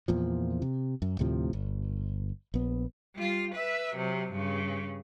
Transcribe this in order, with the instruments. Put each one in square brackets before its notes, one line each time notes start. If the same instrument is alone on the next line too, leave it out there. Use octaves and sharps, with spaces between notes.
[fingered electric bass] E2 A#2 F3
C3
F#2
D2 A2 C3 F3
G1
A#1 B3
[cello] G3 F4
B4 E5
C3 F#3
G2 C#3